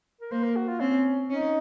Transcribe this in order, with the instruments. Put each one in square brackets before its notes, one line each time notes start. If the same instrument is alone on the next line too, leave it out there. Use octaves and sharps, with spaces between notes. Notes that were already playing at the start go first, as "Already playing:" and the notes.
[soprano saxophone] A#4
[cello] A#3 [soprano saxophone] C5
[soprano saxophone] A#4
F#4
F4
[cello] C4 [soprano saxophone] C#4
[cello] C#4 [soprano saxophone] D#4